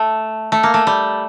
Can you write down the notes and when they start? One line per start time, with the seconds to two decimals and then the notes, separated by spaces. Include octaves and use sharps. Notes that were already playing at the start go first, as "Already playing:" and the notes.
Already playing: A3
0.52 A3
0.63 A#3
0.74 A3
0.87 G3